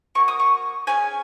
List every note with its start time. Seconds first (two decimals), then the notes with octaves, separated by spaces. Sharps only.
0.15 A#3 F#4 C#6
0.28 D#6
0.40 C#6
0.87 C#4 G#4 G#5